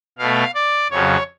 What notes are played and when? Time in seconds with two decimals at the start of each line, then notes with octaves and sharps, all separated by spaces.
0.18 B2 A3 F5
0.55 D5
0.90 F2 C#3 F#3 C#5